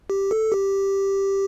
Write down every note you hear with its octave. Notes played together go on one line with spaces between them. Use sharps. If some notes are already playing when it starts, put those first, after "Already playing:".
G4
A4
G4